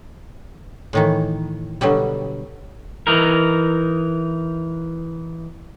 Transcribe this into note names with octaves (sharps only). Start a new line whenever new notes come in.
A2 D#3 E3
B2 D3 F#3 G3
E3 D#4 A#4